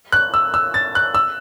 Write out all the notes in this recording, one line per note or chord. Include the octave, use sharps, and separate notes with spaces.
F#6
E6
E6
A6
F#6
E6